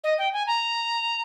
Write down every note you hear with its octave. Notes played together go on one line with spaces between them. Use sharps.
D#5
G5
G#5
A#5